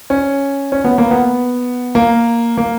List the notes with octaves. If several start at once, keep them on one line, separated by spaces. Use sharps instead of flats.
C#4
C#4
B3
A#3
B3
A#3
A#3